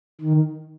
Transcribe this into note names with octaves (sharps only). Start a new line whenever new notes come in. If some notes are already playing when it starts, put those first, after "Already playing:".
D#3